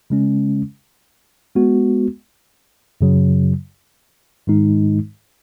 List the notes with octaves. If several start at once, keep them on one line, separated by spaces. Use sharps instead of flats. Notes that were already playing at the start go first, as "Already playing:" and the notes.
C#3 G#3 C#4
G#3 B3 F#4
F#2 C#3 F#3
G#2 D#3 G#3 D#4